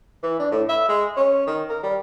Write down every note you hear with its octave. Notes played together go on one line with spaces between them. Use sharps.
E3
D4
A2
E5
G#3
C#4
D#3
A#4
G3